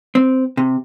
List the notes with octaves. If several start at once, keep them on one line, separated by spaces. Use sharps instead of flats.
C4
C3